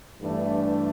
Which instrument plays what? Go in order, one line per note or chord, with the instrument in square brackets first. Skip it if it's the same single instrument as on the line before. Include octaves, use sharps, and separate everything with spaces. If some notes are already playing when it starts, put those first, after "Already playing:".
[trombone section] G2 E3 A3 D4